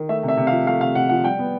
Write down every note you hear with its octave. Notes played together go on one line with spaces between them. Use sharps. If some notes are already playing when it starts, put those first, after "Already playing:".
Already playing: D#3
A3 E5
C3
E5
C3
F5
F3
A3 F5
C3 F5
C3 F#5
F3 F#5
G3 G5
B3